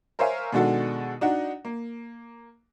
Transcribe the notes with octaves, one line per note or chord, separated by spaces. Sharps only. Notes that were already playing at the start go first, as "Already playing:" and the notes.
A#4 C5 C#5 E5 F5 G#5
B2 D#3 G#3 D4 F#4 A4
D4 D#4 F#4 F#5
A#3